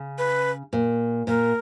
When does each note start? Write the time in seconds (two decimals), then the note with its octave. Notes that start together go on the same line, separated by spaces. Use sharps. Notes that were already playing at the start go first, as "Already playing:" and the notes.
Already playing: C#3
0.18 B4
0.73 A#2
1.27 A#2 A#4